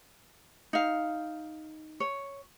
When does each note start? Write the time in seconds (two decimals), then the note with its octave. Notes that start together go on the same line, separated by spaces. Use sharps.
0.73 D#4 F5
2.00 C#5